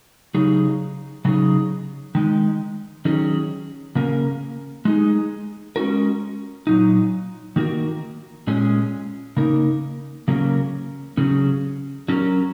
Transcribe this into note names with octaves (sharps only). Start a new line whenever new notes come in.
C#3 F#3 D#4 G#4
C#3 F#3 D#4 G#4
D#3 G#3 D#4
D#3 F#3 C#4 G#4
C#3 A#3 C#4 A#4
G#3 D#4 G#4
G#3 C#4 F#4 A#4
A#2 F#3 D#4
D#3 A#3 F#4 A#4
A#2 G#3 C#4 G#4
C#3 A#3 D#4 A#4
C#3 F#3 A#3 C#4 A#4
C#3 F#3 C#4 G#4
F#3 C#4 F#4 A#4